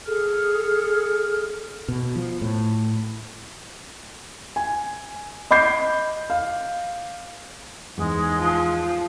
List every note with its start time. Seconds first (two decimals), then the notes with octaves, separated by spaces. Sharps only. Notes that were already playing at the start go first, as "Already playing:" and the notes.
0.05 G#4 A4 F6
1.88 B2
2.16 F3
2.41 A2
4.56 G#5
5.51 D#5 B5 D6 G6 C7
6.30 F5
7.97 E2 G#2 G#3
8.39 F3